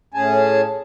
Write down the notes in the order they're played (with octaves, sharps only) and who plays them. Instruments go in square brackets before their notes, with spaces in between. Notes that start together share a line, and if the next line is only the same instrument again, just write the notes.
[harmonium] A2 C#4 G#4 G#5 A5